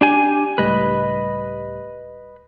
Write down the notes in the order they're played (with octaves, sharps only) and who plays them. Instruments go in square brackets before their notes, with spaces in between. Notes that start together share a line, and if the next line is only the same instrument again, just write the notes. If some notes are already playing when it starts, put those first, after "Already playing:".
[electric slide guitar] D4 G4 G#5
[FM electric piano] C#2 A2 G3 [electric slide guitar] B4 D#5